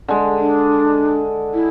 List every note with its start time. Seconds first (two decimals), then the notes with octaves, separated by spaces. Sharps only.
0.08 D3 G#3
0.38 D4
1.54 E4